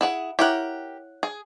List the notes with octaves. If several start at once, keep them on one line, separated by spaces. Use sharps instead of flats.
E4 G#4 F#5
E4 G4 A#4 C#5 F#5
G#4